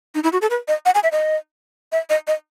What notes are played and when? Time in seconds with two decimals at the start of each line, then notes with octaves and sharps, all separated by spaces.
0.15 D#4
0.23 E4
0.33 F#4
0.42 A4
0.50 B4
0.68 D#5
0.86 F#5
0.95 G#5
1.03 E5
1.12 D#5
1.92 E5
2.10 D#5
2.27 D#5